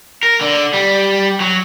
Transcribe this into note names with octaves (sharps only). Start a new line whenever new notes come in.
A#4
D3
G3
F#3